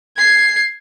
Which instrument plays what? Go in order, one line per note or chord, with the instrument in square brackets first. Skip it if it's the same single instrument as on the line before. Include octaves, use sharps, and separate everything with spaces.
[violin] G#6 C7